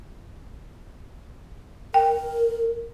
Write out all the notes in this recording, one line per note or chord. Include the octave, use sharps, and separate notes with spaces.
A#4 G5